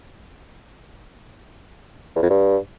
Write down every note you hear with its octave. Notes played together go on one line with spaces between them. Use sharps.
E2
F2
G2